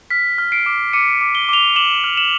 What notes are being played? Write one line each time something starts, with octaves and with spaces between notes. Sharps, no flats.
F6 B6
F6
C7 D7
D6
D6 C#7 D#7
D6
G7
D6 F7 G7
D6 E7 F#7
F6
E7 F#7